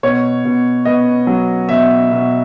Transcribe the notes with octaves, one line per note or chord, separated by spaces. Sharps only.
B2 C#5
B2
B3 D#5
F#3
B2 E5
B2